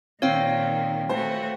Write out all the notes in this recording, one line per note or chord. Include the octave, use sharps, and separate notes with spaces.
A#2 D#3 C4 C#5 F5 G5
A3 F#4 C5